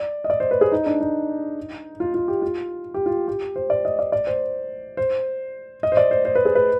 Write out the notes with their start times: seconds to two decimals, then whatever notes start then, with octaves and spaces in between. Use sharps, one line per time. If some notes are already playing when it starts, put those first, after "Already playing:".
Already playing: D5
0.24 D#5
0.30 D5
0.40 C5
0.51 B4
0.61 G#4
0.72 D#4
0.86 D4
1.01 D#4
2.00 F4
2.14 F4
2.28 G4
2.42 F4
2.94 G4
3.06 F4
3.28 G4
3.56 C5
3.70 D5
3.85 D#5
3.99 D5
4.12 D5
4.27 C5
4.97 C5
5.83 D#5
5.92 C5
5.97 D5
6.11 C5
6.25 C5
6.35 B4
6.45 G#4
6.55 B4